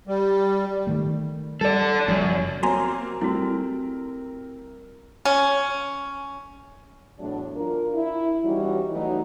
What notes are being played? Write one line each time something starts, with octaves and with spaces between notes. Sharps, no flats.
G3
D#3 A3
G3 A4 D5
F#1 F#2 F3 G3
F#3 A#3 C4 F#4 G#5 A#5 C6
G3 A3 C4 E4 F#4 A#4
C#4
E2 A2 F#3 D4
D4 F4 A#4
E4
E3 G3 C#4 D#4 F#4
E3 F#3 A3 D#4